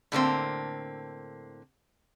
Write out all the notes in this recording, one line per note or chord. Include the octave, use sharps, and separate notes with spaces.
A2 D3 A#3 C4